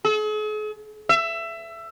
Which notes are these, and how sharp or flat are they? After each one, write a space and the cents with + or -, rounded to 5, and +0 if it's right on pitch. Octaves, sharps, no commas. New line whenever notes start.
G#4 +45
E5 +20